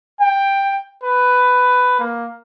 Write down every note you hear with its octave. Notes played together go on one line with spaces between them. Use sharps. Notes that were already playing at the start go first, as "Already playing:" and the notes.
G5
B4
A#3